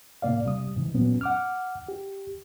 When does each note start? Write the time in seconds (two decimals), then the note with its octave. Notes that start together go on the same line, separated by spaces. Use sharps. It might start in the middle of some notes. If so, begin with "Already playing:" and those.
0.22 A2 C3 A#3 D5 F5
0.45 C3 G3 D#6
0.76 G#2 C3 E3
0.94 A#2 F#3 B3 C#4
1.21 F#5 D6 F6
1.88 G4